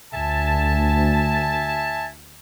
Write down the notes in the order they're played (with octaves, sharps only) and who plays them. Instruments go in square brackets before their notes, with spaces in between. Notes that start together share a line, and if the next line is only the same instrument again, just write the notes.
[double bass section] D2 [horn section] E5 G#5 A5